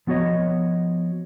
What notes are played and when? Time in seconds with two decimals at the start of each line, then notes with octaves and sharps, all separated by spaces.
0.07 F3 B3 F#4 C#5 D#5